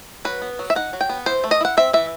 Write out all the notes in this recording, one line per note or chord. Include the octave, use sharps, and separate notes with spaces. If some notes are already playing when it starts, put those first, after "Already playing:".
F#3 B4
B3
F#3
E5
D#4 F#5
F#3
G5
B3
E3 C5
A3
D#5
E4 F#5
C4 E5
E3 E5